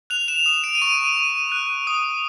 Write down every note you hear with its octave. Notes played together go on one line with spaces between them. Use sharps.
F#6 F7
E7
D#6
D7
D#7
C#6 D7
C#6
F#6
D#6